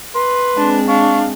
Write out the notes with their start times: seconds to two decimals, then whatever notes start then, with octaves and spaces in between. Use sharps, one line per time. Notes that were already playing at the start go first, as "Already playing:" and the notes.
0.15 B4 C6
0.57 G#3 C4 D4
0.88 D4 F5 C#6